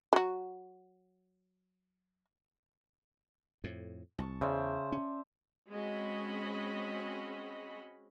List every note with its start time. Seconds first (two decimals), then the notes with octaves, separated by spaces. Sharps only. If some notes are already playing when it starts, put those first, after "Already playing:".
0.13 F#3 F#4
3.64 F2 A2
4.18 C2 A5 C#6
4.41 E2 C#3 C5 D5 E5
4.92 C#4
5.70 G#3 C4 C#4 F#4 D#5 B5